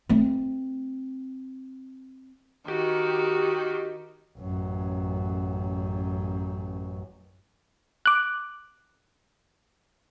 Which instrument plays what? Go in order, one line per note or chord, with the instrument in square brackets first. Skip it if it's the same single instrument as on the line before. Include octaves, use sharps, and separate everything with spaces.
[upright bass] A3 C4
[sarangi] D#3 [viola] F#4 [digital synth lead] G4
[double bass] A1 F#2
[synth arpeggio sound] D6 F#6